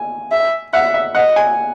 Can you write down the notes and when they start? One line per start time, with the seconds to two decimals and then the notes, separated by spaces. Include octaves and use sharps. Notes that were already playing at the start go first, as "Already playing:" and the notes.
Already playing: G#5
0.32 E5
0.73 E5 F#5
0.94 E5
1.15 D#5 F#5
1.36 G#5